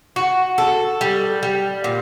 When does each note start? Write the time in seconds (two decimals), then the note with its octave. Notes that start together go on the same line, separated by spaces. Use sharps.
0.16 F#4
0.58 A4
1.01 G3
1.43 G3
1.84 A#2